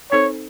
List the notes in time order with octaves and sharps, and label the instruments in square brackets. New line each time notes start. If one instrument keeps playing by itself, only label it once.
[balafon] C4 D#4 A4 C5 [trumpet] C#5